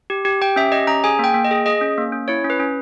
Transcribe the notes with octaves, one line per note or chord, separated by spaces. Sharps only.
G4
G4
G4 G5
C#4 E5
G4 D#5
C#4 A#5
G#4 G#5
A#3 G5
A#3
D#5
G#4
G#4 D#5
C#4
A#3
C#4
E4 C#5
C#4
B4
C#4